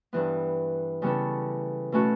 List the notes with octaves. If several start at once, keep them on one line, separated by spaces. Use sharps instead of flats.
G2 E3 B3
C#3 G3 B3 E4 A4
B2 A3 C#4 F#4 A4